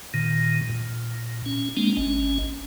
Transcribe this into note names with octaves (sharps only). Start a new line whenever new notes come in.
A#2 D#3
A#2
C#4
G#3 A#3 C4 D4
G#1 C#4